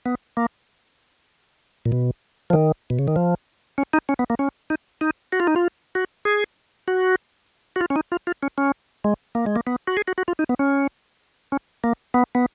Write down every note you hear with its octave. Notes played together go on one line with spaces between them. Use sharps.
B3
A#3
A#2
B2
F3
D#3
B2
C#3
D#3
F3
C#4
D#4
C#4
B3
A#3
C#4
D#4
D#4
F#4
F4
D#4
F4
F#4
G#4
F#4
F#4
F4
C#4
D#4
F4
F4
C#4
C#4
G#3
A#3
G#3
A#3
B3
F#4
G#4
F#4
F#4
F4
D#4
B3
C#4
C#4
A#3
B3
B3